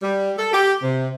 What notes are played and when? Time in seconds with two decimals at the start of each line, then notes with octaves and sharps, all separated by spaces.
0.02 G3
0.38 A4
0.53 G4
0.83 C3